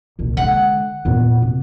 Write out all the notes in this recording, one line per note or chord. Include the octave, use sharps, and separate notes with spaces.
D#1 C2
D3 G#3 F#5
E2 A#2
C3